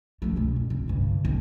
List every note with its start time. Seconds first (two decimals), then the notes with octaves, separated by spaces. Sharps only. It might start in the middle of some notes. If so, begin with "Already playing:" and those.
0.22 F3 A3
0.36 C#2 B2
0.56 G2
0.70 C3
0.88 G2 D3
1.25 B1